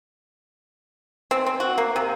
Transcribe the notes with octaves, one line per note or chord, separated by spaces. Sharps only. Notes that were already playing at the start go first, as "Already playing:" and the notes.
C4
C4
F#4
A#3
C3